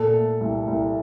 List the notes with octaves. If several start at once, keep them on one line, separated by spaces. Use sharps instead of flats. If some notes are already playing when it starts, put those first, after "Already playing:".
Already playing: A#2 A4
A3
C2
C2